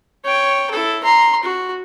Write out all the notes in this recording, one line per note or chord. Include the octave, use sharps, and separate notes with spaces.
C#5 G5
E4 A4
A#5 C6
F#4